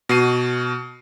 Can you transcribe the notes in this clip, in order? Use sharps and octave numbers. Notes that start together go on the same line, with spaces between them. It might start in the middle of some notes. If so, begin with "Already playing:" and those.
B2 F#4 C7 D#7